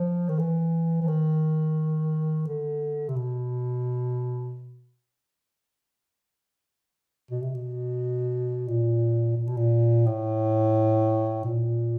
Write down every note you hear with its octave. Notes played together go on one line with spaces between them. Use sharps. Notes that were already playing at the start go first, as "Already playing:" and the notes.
Already playing: F3
D#3
E3
E3
D#3
D3
C3
B2
B2
C3
B2
A#2
A#2
B2
A#2
A2
A#2